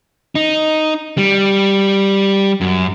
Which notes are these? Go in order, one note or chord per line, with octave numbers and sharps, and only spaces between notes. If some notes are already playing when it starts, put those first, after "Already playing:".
D#4
G3
F#2